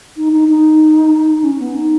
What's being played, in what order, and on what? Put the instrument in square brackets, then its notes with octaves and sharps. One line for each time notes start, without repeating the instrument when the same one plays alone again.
[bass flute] D#4
D#4
D#4
C#4
B3
D#4